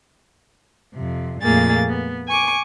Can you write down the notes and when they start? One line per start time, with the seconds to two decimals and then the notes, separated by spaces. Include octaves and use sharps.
0.93 F2 C3
1.42 F2 A#2 A3 A#3 G#4 A6
1.88 B3
2.28 G#5 C#6 D6